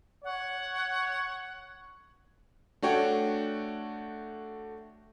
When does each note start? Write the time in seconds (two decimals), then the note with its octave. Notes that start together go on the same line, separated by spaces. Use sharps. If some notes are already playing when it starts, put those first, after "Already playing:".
0.24 C#5 F#5
2.82 A3 D4 F#4 C#5 G5